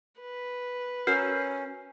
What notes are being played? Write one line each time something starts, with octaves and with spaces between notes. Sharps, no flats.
B4
C#4 F#4 A#4 E6 F6 G6 C7